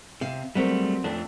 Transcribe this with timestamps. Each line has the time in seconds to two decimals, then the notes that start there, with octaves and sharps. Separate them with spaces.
0.21 C3 F5
0.55 F#3 G3 A3 C4 A#4
1.04 F2 A3 D4